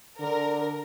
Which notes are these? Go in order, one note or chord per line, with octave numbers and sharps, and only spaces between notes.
D3 A#4